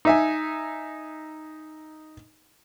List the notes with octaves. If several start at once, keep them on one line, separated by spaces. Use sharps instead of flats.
D#4 E5 G#5